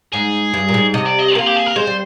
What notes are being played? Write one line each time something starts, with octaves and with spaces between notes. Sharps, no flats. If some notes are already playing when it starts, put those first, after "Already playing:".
G#2 G#4
G2
A#2
G#2
C3 D#5
D5
D#5
A#3 F4
G4
G#4
A#4
G#3 C5
G3